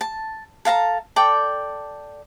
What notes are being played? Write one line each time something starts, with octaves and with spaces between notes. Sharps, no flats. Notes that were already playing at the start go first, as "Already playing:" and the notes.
A5
A4 F5 A5 A#5
A4 D5 G5